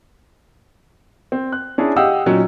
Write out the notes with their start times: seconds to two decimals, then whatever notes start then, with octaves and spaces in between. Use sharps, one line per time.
1.32 C4
1.52 F#6
1.78 C#4 D4 E4 G#4
1.96 G4 D#5 F5 F#5 D#6 E6
2.26 A#2 F#3 C#4 D#4